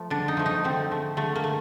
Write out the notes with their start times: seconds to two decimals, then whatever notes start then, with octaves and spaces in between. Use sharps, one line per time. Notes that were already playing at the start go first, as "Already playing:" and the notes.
Already playing: F3 A3
0.10 D3 D4
0.28 D#4
0.37 F3 A3
0.46 D#4
0.64 D3 C4
0.91 F3 A3
1.17 D3 A3
1.36 A#3
1.44 A3